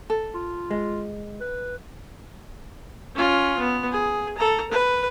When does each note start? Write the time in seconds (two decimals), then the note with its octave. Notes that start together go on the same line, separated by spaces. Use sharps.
0.10 A4
0.34 F4
0.71 G#3
1.40 B4
3.15 C#4 F4
3.59 B3
3.92 G#4
4.38 A4 A#5
4.72 B4